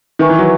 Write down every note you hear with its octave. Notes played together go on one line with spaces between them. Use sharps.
D#3 B4 E5 G#5 C#6
E3
F#3